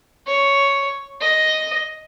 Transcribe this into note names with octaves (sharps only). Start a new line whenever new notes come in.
C#5
D#5